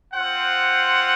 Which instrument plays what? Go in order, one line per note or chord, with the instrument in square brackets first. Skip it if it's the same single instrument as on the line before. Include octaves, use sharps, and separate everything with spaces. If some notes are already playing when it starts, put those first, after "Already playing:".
[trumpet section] C4 F4 C5 F#5